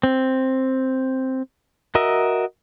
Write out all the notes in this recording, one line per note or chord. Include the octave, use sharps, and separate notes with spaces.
C4
F#4 A#4 D#5 E5